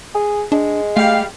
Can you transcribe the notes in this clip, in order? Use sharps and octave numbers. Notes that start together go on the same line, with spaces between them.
G#4
G#3 D4
G3 A3 G4 F5